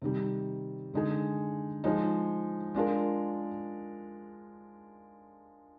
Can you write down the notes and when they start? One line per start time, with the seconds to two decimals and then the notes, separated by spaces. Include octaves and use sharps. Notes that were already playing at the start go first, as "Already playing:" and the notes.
0.02 C3 D#3 G3
0.94 D3 G#3 D#4 G#4
1.84 F3 G#3 D#4
2.74 G#3 D4 F4 A#4